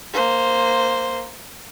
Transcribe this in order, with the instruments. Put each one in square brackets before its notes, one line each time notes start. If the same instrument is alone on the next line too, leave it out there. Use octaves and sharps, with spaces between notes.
[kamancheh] A#3 C5